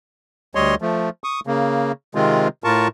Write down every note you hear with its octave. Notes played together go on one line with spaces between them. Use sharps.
D2 G3 C#5 D#5 C6
F3 A3
C#6 D#6
C#3 A#3
C3 D#3 G#3 C4 F4
A2 F4 A#4 A5 C#6